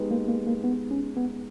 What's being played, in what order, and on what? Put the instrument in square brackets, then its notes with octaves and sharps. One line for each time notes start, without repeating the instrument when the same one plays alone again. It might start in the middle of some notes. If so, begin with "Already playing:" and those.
Already playing: [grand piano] G#3 B3 D#4 G4 B4
[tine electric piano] A#3
A#3
A#3
B3
C#4
B3